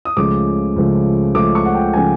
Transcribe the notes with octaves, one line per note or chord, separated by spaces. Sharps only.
D#6
C#2 C#3 F3 A3 D6
C#2 C#3 F3 A3
C#2 C#3 F3 A3 D6
C#6
F#5
G5
C#3 F3 A3 G#5